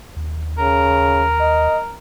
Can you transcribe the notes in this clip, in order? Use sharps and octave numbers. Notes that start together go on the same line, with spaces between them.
D#2
C#3 A#4
D#5